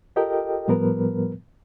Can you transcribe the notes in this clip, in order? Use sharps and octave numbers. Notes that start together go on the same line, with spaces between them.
F4 G4 A4 A#4 D#5 G5
A2 F3 G3 B3 A#4 B4